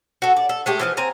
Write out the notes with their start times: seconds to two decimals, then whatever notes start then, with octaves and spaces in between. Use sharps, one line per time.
0.22 F#4 A4
0.37 D5
0.49 A4
0.66 G#3 A3 G4
0.80 E3 F3 D#5
0.97 C4 G#5 A#5